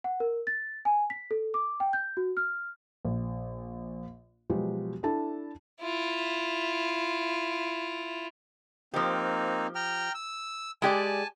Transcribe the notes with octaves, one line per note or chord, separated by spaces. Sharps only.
F#5
A#4
A6
G#5
B6
A4
D6
G5
G6
F#4
F6
A#1
B2 F3 F#3 G#3 G4
D4 E4 A4 A5
E4 F4
F3 A#3 C4 D#4 G4
G5 A#5 F6
E6
G#3 G4 D5 G#5 A5